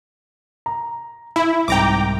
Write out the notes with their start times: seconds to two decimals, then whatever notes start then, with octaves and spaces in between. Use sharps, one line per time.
0.66 A#5
1.36 E4 B5
1.68 C2 G#2 G5 A#5 D6 F7